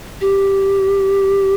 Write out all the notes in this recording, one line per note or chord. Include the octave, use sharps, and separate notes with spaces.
G4